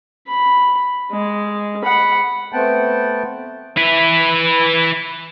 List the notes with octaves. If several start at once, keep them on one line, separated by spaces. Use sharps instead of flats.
B5
G#3
F#5 B5
A3 B3 C4 F#5 G5 A5
E4 B4